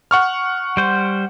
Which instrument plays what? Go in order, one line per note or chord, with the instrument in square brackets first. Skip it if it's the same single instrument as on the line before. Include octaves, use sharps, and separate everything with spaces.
[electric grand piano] F#5 C#6 F6
[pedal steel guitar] G3 C5